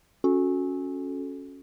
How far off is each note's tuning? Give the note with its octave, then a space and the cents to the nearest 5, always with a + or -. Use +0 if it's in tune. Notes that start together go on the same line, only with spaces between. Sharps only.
C#4 +0 F#4 -20 A4 -20